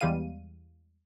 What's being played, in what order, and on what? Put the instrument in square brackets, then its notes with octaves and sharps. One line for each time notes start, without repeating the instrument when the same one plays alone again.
[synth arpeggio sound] E2 E3 G3 G#3 F5 D#7